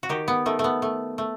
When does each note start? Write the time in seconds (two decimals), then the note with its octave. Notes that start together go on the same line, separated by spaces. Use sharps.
0.03 F#4
0.09 D#3 G4
0.28 B3
0.46 D#3 A3
0.59 A3
0.64 B3
0.82 A3
1.18 A3